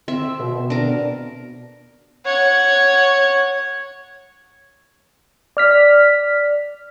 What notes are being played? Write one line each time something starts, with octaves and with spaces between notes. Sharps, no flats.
C4 E5
B2
D4 A#4
C#5 F#5
D5 F6 B6